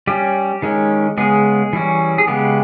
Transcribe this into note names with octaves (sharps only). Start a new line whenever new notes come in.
G3 C#4 G4
D#3 G#3 C#4
C#3 G#3 B3 G#4
E3 G3 C#4
G#4
C#3 G#3 B3 G4